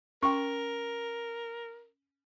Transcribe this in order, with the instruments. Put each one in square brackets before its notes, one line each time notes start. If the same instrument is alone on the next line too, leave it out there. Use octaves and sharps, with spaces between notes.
[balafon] C#4 G5 [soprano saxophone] A#4 [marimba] C#6